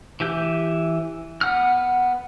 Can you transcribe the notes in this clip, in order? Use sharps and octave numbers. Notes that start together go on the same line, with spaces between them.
E3 G4 G6
B3 F#5 F6